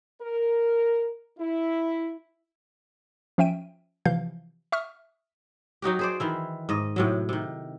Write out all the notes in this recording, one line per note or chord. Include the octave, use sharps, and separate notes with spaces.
A#4
E4
F3 C#4 E5 G5 D7 D#7
C3 E3 F3 F5 G6
E5 C#6 D#6 F6
F#3 D#4 F#4 G4
G#4 C5 D5
D#3 E3 E4
G#2 D#5
A2 C3 F#3
C3 D#3